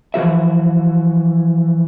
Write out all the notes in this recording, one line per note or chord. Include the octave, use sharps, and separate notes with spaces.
E3 F3 F#4 E5